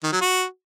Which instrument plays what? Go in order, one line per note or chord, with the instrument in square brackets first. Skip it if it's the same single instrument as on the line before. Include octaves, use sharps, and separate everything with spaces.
[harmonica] D#3
F#3
F#4